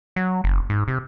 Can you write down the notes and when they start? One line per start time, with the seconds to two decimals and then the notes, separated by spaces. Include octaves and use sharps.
0.16 F#3
0.44 F#1
0.70 G#2
0.88 C3